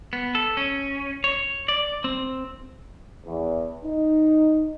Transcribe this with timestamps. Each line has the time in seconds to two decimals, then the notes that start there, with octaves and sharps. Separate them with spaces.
0.13 B3
0.35 A4
0.57 C#4
1.24 C#5
1.68 D5
2.04 C4
3.25 E2
3.84 D#4